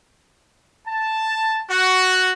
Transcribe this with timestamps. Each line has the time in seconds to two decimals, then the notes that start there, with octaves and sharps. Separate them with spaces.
0.87 A5
1.70 F#4